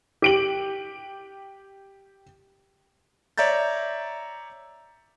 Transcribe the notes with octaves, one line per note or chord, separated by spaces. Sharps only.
G4 D7 F#7
C#5 D5 E5 A#5 G6 A6